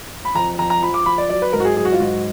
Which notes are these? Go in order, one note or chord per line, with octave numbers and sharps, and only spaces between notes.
B5
F2 A#5
F2 A#5
A#5
F3 B5
D6
F3 B5
D5
F#3 D5
B4
G#2 A#4
F#4
G#4
F#3 G#4
F#4
F4
G#2 F#4